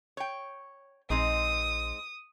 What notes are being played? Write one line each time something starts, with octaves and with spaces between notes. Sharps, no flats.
C#5 G5
A#1 G#3 C4 D#4 D#6